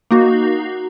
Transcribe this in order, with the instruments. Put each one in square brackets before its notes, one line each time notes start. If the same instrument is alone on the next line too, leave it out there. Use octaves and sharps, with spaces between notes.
[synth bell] A#3 D#4 F#4